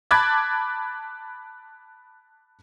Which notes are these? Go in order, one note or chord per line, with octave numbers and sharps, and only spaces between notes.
A5 B5 D6 F#6 G#6 A6